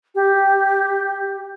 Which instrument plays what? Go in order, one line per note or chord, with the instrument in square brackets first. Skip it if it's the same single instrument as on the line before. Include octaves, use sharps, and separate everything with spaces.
[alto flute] G4